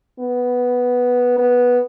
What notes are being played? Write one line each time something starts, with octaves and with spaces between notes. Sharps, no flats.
B3
B3